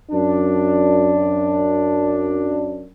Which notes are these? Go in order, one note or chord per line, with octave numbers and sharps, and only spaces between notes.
F#2 D4